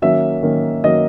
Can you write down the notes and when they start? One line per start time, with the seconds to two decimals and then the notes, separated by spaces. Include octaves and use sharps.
0.02 D#3 F#3 A#3 C#4 E5
0.43 D#3 F#3 A#3 C#4
0.84 D#3 F#3 A#3 C#4 D#5